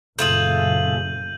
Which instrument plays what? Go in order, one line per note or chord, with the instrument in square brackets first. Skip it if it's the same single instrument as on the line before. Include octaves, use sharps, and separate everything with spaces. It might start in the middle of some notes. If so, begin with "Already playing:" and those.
[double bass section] F#1 A#2 [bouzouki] A3 F4 G#4 [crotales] G6 D#7 F#7